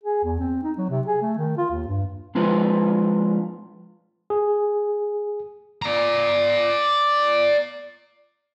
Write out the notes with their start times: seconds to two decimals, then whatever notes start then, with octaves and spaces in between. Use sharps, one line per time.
0.03 G#4
0.24 E2
0.40 C4
0.63 D#4
0.78 F#3
0.90 C3
1.07 G#4
1.22 A3
1.38 D#3
1.57 F4
1.71 D#2
1.87 G2
2.35 F3 G#3 D4 F4 B4 C5
4.30 G#4
5.82 D5 A#5